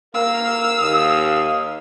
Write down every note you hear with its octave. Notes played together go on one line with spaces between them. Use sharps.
A#3 A#4 F5 E6
D#2 D#6